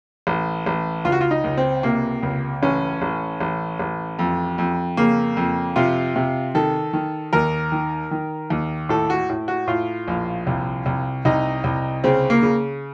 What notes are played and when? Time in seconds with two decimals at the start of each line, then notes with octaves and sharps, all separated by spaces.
0.27 A1
0.66 A1
1.05 C#2 F4
1.12 F#4
1.21 F4
1.31 D#4
1.44 C#2
1.57 C4
1.83 C3 A#3
2.23 C#2
2.63 A1 C#4
3.02 A1
3.41 A1
3.79 A1
4.19 F2
4.58 F2
4.97 C#3 A#3
5.37 F2
5.76 C3 F4
6.16 C3
6.55 D#3 A4
6.93 D#3
7.33 D#2 A#4
7.72 D#3
8.11 D#3
8.50 D#2
8.89 A2 A4
9.10 F#4
9.30 A2
9.48 F#4
9.68 A2 F4
10.08 A#1
10.47 C2
10.86 C2
11.25 C2 D#4
11.64 C2
12.04 C#3 C4
12.30 A#3
12.43 C#3